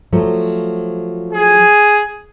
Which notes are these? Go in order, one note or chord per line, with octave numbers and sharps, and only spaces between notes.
F3 F#3 A3
G#4